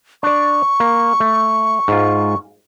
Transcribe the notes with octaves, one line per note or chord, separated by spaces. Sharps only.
D4 D5 C#6
A#3
A3
G#2 F4